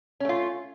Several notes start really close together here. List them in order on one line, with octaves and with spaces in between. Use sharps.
C#4 A3 F4